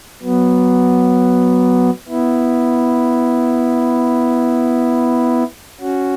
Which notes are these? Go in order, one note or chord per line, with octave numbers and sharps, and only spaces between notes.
F#3 B3
B3 E4
C#4 F#4